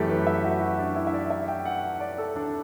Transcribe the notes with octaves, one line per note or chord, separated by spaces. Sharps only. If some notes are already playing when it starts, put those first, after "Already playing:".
Already playing: F#2 E3 A3 G4 A4
B4
E5
F#4
F#4
D4
E4
E5
D5
E5
G5
F#5
D5
A4
D4